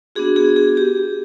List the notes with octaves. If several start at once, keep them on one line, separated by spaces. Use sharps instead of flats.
B3 D4 F#4 G#4
G#4
G#4
G4